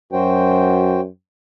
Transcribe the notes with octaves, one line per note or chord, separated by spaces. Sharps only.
F#2 F#4 C5 G5